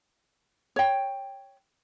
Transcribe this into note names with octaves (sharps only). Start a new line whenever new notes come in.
C#5 G5